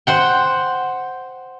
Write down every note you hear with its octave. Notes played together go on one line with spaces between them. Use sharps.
C5 F#5 G5